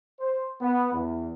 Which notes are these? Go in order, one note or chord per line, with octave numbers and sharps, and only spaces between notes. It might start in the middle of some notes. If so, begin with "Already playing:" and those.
C5
B3
E2